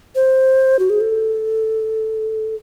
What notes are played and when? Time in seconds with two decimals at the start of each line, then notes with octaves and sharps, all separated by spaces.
0.15 C5
0.79 F#4
0.90 G#4
1.01 A4